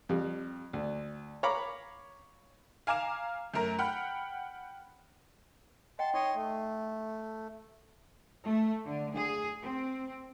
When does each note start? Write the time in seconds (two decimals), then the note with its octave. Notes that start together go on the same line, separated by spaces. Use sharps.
0.09 F2 G3
0.73 D2
1.43 C#5 F5 A#5 B5 D6
2.87 F5 G#5 A#5 D6 F6 E7
3.54 F#2 A3 A#4 A#5
3.79 F#5 G5 B5 F6
5.99 D#5 F#5 G5 A5 C6
6.14 D#4 C#5 D#5 G5 C6
6.35 A3
8.45 A3
8.86 D3
9.15 G#4
9.62 C4